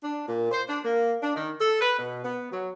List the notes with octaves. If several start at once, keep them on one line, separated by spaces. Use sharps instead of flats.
D4
A#2
C5
D4
A#3
D4
D#3
A4
B4
B2
B3
F#3